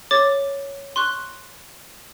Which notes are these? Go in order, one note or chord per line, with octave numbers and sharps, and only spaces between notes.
C#5 D6 A6
C6 C#6 F#6